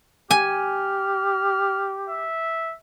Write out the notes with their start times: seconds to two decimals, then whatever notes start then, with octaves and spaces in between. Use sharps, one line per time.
0.31 G4 G#5 F6
2.09 E5